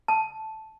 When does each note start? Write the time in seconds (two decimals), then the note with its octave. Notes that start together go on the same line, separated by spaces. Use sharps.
0.08 A5